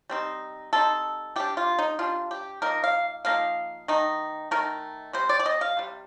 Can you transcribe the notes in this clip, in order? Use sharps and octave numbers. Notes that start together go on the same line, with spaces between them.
G3 C4 D#4
G3 C4 D#4 A4
G3 D4 G4
F4
D#4
G3 D4 F4
G4
F3 A#3 D#4 A#4
F5
F3 A#3 D#4 F5
D#3 A3 D#4
D#3 A3 D#4 A#4
C3 G3 C5
D5
D5
D#5
F5
C3 G3